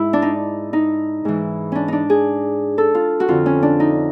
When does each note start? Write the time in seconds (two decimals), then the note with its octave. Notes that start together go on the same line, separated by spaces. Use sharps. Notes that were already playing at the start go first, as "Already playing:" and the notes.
Already playing: G#2 E4
0.13 D4
0.22 D#4
0.73 D#4
1.25 G#2 E3
1.72 C#4 D4
1.88 D4 D#4
2.10 G#4
2.78 A4
2.95 F4
3.20 F#4
3.28 F2 D3 F4
3.46 C#4
3.63 D4
3.80 D#4